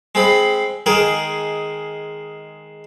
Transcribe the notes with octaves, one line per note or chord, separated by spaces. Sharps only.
G#3 C4 B5
D#3 G#3 G#4 A#4